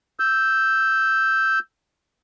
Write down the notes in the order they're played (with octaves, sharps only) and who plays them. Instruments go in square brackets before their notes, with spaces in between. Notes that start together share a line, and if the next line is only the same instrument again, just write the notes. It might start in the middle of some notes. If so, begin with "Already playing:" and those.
[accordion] E6 G6